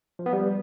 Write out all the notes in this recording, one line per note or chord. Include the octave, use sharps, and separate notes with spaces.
F3
B3
G3